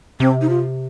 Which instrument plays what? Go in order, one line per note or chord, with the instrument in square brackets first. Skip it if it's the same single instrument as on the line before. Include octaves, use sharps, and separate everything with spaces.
[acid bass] C3 [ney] C4
[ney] D#4
F4